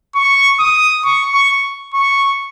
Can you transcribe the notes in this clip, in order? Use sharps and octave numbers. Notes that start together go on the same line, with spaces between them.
C#6
D#6
C#6
C#6
C#6